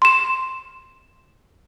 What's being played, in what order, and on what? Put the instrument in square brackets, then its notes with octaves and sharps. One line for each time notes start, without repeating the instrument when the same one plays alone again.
[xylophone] C6 E7